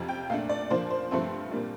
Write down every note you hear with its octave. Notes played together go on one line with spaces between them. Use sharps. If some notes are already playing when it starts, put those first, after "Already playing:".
Already playing: F2 C3 F3
G5
A#2 A3 D4 F5
D5
A#2 F3 A#3 D4 C5
C5
G2 F3 A3 C4
A#2 G3 A#3 D4